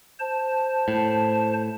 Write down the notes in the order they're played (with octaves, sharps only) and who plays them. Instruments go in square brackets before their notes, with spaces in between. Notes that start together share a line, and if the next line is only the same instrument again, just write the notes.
[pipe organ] C5 A5
[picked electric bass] A2